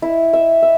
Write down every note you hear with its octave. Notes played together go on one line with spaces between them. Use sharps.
E4
E5
E5